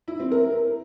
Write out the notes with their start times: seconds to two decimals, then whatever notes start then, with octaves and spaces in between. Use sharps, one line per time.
0.08 E4
0.20 C4
0.31 A#4